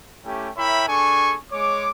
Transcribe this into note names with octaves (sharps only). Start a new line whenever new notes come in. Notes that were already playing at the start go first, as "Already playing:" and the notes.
A3 C#4 E4 G4
E4 A#4 C#5 E5 G5 B5
D4 G#4 A4 G#5 C#6
G#3 C#5 D6